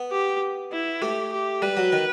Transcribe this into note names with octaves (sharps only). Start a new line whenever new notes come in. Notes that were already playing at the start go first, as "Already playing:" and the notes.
Already playing: B3
G4
E4
A3 G4
G4
G3 B4
F#3
D#3